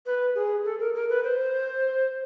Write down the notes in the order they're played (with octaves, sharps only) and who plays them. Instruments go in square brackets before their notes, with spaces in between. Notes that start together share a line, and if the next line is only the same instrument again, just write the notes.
[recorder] B4
G#4
A4
A#4
A#4
B4
C5